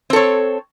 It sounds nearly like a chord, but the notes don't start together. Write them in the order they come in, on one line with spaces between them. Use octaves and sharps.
C4 A4 C#5